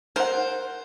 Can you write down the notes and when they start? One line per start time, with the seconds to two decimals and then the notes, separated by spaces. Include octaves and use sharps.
0.16 A#4 C5 F#5